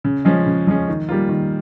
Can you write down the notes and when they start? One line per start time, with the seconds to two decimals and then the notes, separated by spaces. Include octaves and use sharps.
0.04 C#3
0.25 F3 G#3 C#4
0.46 C#3
0.67 F3 G#3 C#4
0.89 D#3
1.09 G3 A#3 F4
1.29 D#3